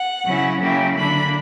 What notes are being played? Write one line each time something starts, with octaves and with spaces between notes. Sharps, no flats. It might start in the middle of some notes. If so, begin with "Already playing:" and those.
Already playing: F#5
C#3 F#3 C#4 E4
C#3 F#3 A#3 C#4 E4 G5
D3 A#3 D4 B5